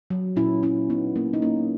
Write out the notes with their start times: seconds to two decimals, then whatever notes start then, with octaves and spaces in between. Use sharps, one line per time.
0.10 F#3
0.36 A#2 C#4 E4
0.63 F#3 C#4 E4
0.89 A#2 B3 D#4
1.15 F#3 A#3 C#4
1.33 D#4
1.42 A#3 C#4